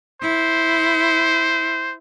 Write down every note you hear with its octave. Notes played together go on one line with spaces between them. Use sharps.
E4 C5